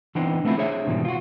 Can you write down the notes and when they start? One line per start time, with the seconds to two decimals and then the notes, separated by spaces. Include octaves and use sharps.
0.15 E3 B3 C4 D4 D#4
0.45 A3 B3 C4 E4 F4
0.57 D4 G#4 C5 C#5 E5
0.87 G#2 B2 D#3 E3 G3
1.05 F4 F#4